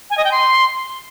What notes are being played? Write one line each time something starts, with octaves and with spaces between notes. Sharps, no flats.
G#5
D#5
G5
C6